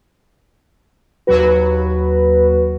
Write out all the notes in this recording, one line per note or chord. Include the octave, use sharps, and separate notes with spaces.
D#2 F#3 F#4 B4